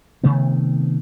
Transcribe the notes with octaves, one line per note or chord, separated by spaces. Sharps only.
C3 D#3 A3 B3